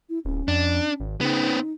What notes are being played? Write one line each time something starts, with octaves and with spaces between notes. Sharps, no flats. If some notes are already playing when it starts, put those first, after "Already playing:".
E4
D1 C#4
F2 D4
G#1
C#3 B3 C4 D#4